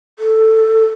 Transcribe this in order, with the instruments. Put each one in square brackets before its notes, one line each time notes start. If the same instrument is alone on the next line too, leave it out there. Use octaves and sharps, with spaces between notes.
[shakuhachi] A4